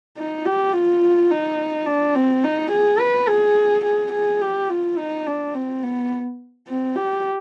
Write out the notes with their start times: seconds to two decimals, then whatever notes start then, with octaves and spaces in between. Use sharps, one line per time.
0.17 D#4
0.46 G4
0.73 F4
1.30 D#4
1.86 D4
2.15 C4
2.44 D#4
2.71 G#4
3.00 B4
3.28 G#4
3.84 G#4
4.13 G#4
4.41 G4
4.69 F4
4.97 D#4
5.26 D4
5.54 C4
5.83 B3
6.68 C4
6.95 G4